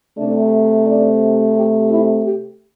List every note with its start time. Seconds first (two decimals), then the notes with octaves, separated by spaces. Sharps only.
0.18 C3 A3 D4
0.87 D4
1.57 G4
1.91 E4
2.25 G4